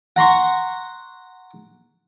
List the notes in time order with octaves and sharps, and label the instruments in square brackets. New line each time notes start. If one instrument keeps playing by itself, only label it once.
[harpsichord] F#5 A#5 C6 C#6